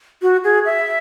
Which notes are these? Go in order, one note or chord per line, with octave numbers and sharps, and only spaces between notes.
F#4
G#4
E5